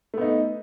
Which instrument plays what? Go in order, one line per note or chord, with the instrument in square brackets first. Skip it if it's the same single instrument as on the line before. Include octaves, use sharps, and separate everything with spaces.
[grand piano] A3
B3
D#4